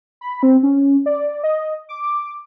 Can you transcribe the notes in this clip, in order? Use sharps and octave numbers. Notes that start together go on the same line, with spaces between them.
B5
C4
C#4
D5
D#5
D6